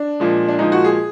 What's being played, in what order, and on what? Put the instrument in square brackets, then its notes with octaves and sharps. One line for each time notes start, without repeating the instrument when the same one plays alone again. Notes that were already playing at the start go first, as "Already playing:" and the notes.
Already playing: [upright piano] D4
A#2 F3 G#3
D4
A#2 F3 G#3 D#4
F#4
G#4